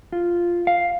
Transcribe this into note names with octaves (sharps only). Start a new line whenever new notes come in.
F4
F5